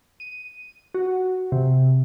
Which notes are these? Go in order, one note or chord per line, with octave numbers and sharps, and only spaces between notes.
D#7
F#4
C3